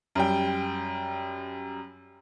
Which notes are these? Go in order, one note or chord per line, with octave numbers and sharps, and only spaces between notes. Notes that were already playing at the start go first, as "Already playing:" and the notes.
F#2 G3 G5